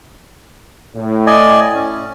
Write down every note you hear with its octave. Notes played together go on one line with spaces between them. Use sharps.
A2
D5 D#5 G#5
C#4